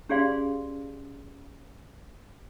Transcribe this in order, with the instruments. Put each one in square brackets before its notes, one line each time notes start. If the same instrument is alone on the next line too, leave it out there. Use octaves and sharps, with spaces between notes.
[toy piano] C#4 G4 G#4 D5 F5 C6